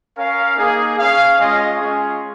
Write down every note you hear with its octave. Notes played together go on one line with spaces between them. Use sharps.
C#4 A#4 F5
A#3 D#4 G#4
C#4 G#4 F5
G#3 C#4 F4 G#4 D#5
G#3 C#4 F4 G#4